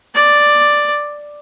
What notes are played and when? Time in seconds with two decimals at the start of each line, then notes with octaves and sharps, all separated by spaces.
0.15 D5